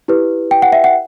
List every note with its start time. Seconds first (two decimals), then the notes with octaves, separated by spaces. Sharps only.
0.08 E4 G4 B4
0.51 G5
0.62 F#5
0.72 E5
0.84 F#5